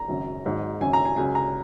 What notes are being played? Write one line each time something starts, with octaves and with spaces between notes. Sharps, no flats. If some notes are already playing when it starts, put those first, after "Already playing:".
Already playing: A#5
G#1 F#2 C#3
G#1 G#2 F#3
G#1 F#2 C#3 G#5
A#5
G#5
C#2 C#3 F#3 G#5
A#5